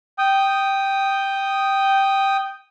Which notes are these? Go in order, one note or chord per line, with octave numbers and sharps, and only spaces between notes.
G5 D#6